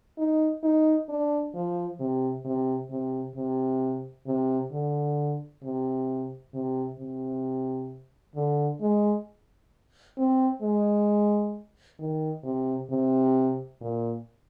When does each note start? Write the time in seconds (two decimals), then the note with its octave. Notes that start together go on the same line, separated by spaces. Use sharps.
0.18 D#4
0.64 D#4
1.09 D4
1.54 F3
2.00 C3
2.45 C3
2.91 C3
3.36 C3
4.27 C3
4.72 D3
5.63 C3
6.54 C3
6.99 C3
8.36 D3
8.81 G#3
10.18 C4
10.62 G#3
11.99 D#3
12.44 C3
12.90 C3
13.81 A#2